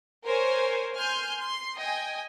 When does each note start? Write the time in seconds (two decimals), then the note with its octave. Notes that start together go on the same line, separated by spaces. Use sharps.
0.25 A#4 C5 C#5 G#5
0.95 G#5 C6 F6 G6
1.39 C6
1.76 D#5 G5 G#5